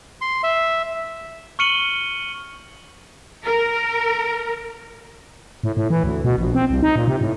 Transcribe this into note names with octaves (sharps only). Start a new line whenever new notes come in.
C6
E5
C#6 F6 C#7 D#7 F#7 G7
A#4
A2
A2
E3
D2
B2
A#1
C4
C2
D#4
A#2
C3
A2